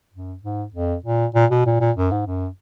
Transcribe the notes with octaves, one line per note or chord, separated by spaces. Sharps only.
F#2
G#2
F2
A#2
A#2
B2
A#2
A#2
F#2
G#2
F#2